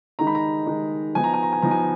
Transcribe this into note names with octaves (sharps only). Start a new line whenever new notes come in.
D#3 G#3 D#4 A#5
B5
A#5
D#3 G#3 D#4
F3 B3 D#4 G#5
A#5
G#5
A#5
G#5
F3 B3 D#4 A#5
G#5